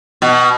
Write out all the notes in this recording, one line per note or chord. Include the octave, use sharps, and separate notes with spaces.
B2